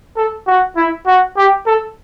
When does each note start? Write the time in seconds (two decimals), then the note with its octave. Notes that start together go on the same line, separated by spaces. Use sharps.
0.17 A4
0.47 F#4
0.76 E4
1.06 F#4
1.37 G4
1.67 A4